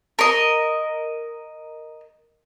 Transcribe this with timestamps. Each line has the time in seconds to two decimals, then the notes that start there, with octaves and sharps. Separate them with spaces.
0.19 A#4 D#5